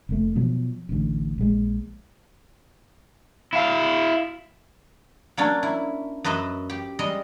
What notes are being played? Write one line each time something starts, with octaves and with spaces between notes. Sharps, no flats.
F1 A3
B2 F3 F#3
A1 D2
A#1 G#3
E4 F5
F#3 A#3 C#4 D4
E4
F#2 B4 D#5 E5
G4
G3 G#3 D#5